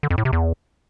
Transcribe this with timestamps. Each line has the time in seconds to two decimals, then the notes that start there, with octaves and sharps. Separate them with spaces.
0.03 D3
0.10 F2
0.18 A2
0.25 C3
0.33 E2